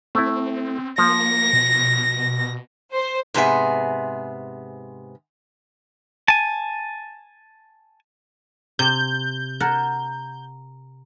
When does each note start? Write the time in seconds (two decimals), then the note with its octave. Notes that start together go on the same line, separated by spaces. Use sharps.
0.15 A3 C4 E4
0.98 F3 A#3 A#6
1.53 B2
2.93 C5
3.34 G#2 C3 B3 G#4 E5
6.28 G#5 A5
8.79 C3 G6
9.60 A#4 F#5 A5